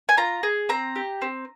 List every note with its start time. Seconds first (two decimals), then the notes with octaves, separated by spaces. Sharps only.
0.09 G#5
0.17 F4 A#5
0.43 G#4
0.69 C4 A#5
0.96 G4
1.22 C4